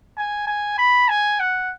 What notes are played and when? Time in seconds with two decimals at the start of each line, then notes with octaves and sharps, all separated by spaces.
0.18 G#5
0.48 G#5
0.78 B5
1.09 G#5
1.40 F#5